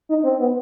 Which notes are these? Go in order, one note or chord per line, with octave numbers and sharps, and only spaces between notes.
D#4
C4
B3